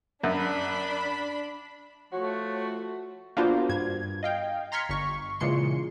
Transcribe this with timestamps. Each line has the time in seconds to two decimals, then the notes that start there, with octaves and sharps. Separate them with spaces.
0.23 F#2 D4 B5
2.13 F3 A3 F#4 C#5
3.37 A#3 B3 D4 F4 F#4 C5
3.69 G2 G#6
4.23 D#5 F5 G5
4.72 A#5 C6 F6 G#6 B6 C#7
4.89 G1 C#6
5.40 A#2 C#3 E3 G#3 C6 C#7